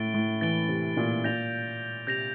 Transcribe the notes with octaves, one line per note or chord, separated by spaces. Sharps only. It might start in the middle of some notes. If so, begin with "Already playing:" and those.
Already playing: A2 A6 D7 G7
A2
E3 A6 D7 G7
C3
A#2
A#2 G6 A#6 F7
C3 G6 A#6 F7